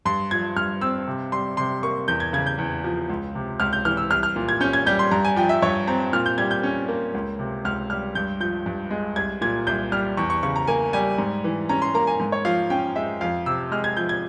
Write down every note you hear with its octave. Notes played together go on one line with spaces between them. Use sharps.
G2 C6
F3 G#6
G2 F6
C4 E6
C3
G3 C6
C3 C6
A#3 C#6
E2 G6
G#6
C#3 G#6
G6
E2
F3
C#2
C3
C#2 F6
G6
E3 F6
E6
C2 F6
F6
A#2
G#6
C#4 G6
G#6
G3 G6
C6
G2 A#5
G#5
F3 G5
E5
G2 C#5
C4 A#5
A#2 F6
G6
G3 G#6
G6
C#4
A#3
C#2
C3
C#2 F6
G3 F6
G2 G6
F3 G6
G2
G#3
C2 G#6
A#2 G#6
C2 G6
G3 F6
E2 C#6
C#6
C#3 C#6
A#5
A#3 G#5
G3 G#5
G#2
E3
C#4 A#5
C6
A#3 A#5
G#5
G#2
C#5
F3 F5
C#4 G5
G#3 E5
F2 F5
C3 E6
G#3 F6
G#6
F3 G6
G#6